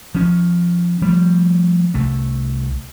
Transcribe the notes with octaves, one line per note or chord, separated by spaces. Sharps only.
F3 C#4
F3 G3 A3
C2 A3